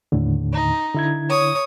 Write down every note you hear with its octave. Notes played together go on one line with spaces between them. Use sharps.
D#2 A2 D3
D#4
D3 E4 G#6
C#5 D#6